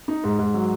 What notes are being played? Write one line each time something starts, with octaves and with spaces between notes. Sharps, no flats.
D#4
G#2
G#2
F#3